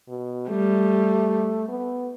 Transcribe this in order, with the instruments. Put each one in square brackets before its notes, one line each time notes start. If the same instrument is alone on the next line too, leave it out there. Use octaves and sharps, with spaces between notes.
[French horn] B2
[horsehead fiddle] G3 [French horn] A3
[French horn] B3